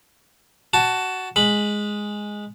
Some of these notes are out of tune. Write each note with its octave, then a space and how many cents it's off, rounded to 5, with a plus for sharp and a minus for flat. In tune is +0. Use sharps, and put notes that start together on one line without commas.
F#4 +15 A5 +0
G#3 +0 B5 +0